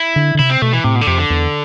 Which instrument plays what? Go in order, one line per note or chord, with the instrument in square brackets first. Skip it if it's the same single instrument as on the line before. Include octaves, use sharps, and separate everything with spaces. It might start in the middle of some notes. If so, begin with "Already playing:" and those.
Already playing: [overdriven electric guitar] E4
[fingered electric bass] D3
D3
[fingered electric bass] C3 [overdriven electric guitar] E4
[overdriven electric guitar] C4
[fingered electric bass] B2 [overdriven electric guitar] A3
[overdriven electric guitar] E3
[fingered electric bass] A2 [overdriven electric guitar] C3
[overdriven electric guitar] B2
D3
[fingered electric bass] F2 [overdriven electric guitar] C3
[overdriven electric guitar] D3
[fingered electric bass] E2